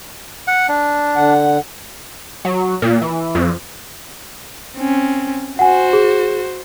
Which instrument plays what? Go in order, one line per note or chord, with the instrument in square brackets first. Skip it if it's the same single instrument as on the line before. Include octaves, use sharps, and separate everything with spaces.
[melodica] F#5
D4
[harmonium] D3 F#5
[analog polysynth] F#3
A#2
E3
F2
[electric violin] C4 C#4
[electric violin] F#4 C5 [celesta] F#5 G#5
[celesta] G#4